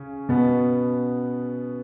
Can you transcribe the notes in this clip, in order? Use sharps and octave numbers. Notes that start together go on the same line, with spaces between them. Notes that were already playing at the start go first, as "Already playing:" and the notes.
Already playing: C#3 C#4
B2 B3